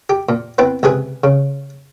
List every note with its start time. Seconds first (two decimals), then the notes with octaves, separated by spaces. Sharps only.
0.10 G4
0.29 A#2
0.58 B3 C4 E4 B4
0.83 C#2 C3 G#4 B4
1.24 C#3